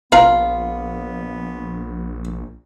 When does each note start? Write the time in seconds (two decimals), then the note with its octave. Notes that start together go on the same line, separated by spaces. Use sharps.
0.12 A#1 B3 F4 B4 F5 A#5